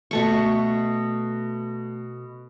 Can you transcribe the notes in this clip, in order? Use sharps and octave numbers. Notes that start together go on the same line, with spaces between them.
B2 A3 C#6